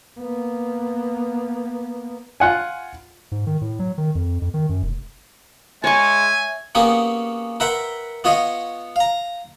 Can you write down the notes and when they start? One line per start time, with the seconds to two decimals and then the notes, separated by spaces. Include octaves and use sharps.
0.20 A#3 B3
2.40 F4 F#5 G#5
3.32 G#2
3.47 D#3
3.61 A2
3.79 F#3
3.98 D#3
4.15 F2
4.42 F2
4.54 D#3
4.69 F#2
4.83 F1
5.84 G#3 C#5 E5 G#5 C#6
6.75 A#3 B3 C#4 G4 G#4
7.60 A#4 B4 E5 F#5 G5 C6
8.24 B3 F4 C#5 D#5 F5
8.96 F5 A#5